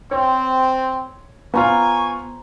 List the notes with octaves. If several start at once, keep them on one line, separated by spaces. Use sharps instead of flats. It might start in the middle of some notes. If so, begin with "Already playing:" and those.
C4 C#5
B3 F4 C5 G#5 A#5 C#6